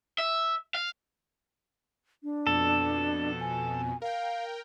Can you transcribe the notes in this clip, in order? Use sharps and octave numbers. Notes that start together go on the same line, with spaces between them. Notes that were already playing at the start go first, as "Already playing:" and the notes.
E5
F5
D4
F2 B2 A4
G#5
A#4 F5 G5